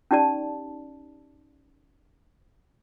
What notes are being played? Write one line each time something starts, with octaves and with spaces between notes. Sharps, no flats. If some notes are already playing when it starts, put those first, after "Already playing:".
C#4 D#4 G4 D5 A5